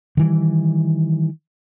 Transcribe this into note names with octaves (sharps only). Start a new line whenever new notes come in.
D#3 E3 G3